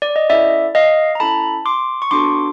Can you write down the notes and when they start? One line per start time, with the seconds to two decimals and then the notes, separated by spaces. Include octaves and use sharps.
0.02 D5
0.16 D#5
0.30 C#4 E4 A4 D5 E5
0.75 D#5 F5
1.15 A#5
1.20 C#4 E4 A4 A5 B5
1.66 C6 D6
2.02 C#6
2.11 B3 D4 F#4 A4 C6 D6